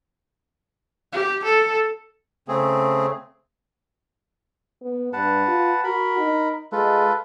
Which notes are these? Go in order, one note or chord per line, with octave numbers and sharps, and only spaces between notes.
G4
A4
C#3 A3 C4 G#4
B3
G2 B4 F#5 A5
F4
F#4 A#4 B5
D#4
G#3 F4 A4 B4